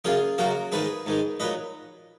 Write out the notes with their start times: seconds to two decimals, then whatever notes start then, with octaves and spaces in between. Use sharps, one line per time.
0.05 F#2 C#3 F#3 A#3 F4 G#4
0.38 F#2 C#3 F#3 A#3 F#4 A#4
0.72 G#2 D#3 G#3 G#4 B4
1.06 G#2 D#3 G#3
1.40 A#2 F#3 B4 D#5